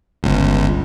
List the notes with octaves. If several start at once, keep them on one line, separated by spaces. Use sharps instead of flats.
G1 C#2